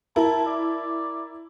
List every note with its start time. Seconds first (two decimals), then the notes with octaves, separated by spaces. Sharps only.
0.16 E4 A#4 A5
0.46 D5